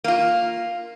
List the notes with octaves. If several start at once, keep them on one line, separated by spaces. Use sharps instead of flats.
A#3 F4